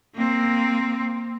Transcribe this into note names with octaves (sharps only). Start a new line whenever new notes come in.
A#3 C4